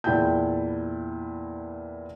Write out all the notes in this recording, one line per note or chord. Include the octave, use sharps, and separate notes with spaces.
E2 A#2 E4 G5 A5 G6